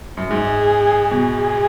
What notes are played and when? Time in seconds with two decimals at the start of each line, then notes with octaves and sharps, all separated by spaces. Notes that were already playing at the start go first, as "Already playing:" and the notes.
0.17 F#2
0.31 G#2 G#4
1.11 B2 G#4